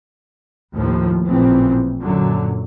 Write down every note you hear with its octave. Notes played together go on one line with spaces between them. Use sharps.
D#2 A2 F3
A1 A#2 C#3 E3 F3 C4
F#2 A#2 D3 F#3